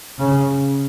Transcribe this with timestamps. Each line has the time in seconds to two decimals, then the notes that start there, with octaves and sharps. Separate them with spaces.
0.19 C#3